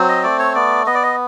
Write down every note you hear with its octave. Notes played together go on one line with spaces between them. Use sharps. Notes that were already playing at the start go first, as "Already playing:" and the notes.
Already playing: F#3 C4
D#5
A3 D5
C#5
B3 D5
B3 D#5
D5
D#5